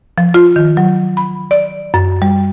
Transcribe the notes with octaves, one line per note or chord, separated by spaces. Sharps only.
F3
F4
D#3
F#3
B5
D5
F#2
G3